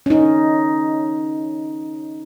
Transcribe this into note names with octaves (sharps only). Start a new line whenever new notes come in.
C#4 D#4